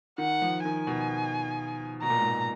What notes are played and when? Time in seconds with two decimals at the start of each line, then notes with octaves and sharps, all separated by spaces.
0.18 D#3 F#5
0.42 F3
0.65 D#3 G#5
0.87 B2
2.02 B2 A#5
2.10 A#2
2.19 G#2
2.26 A#2